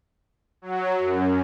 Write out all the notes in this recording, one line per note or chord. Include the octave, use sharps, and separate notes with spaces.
F#3
F#2